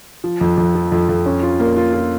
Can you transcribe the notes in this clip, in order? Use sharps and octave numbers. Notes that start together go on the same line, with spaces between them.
F3
F2
F2
F3
F2
F2
C#4
F4
A#3
F4
F4